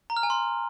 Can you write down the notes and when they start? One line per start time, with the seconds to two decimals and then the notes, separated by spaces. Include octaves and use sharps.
0.10 A#5
0.17 F6
0.23 G#5
0.30 C6